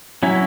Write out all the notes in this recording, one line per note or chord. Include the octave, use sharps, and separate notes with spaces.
F#3 C#4 E4